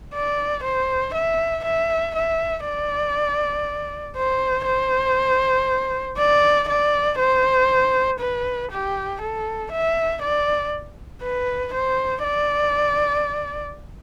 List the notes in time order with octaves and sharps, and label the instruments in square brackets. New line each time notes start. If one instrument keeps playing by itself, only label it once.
[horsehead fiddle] D5
C5
E5
E5
E5
D5
C5
C5
D5
D5
C5
B4
G4
A4
E5
D5
B4
C5
D5